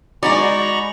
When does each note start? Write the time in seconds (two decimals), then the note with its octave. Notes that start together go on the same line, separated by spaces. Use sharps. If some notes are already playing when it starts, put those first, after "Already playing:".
0.23 G#3 D#4 F#4 D5 G#5 A#5 B5 C#6